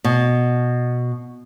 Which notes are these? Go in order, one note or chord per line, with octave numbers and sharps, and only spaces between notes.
B2